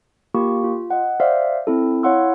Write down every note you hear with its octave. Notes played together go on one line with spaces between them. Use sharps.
A#3 F4 G4 C#6
F4
D#5 F#5
C5 D5 E5 F5
C4 E4 A4
E4 C#5 F5 F#5 C6 E6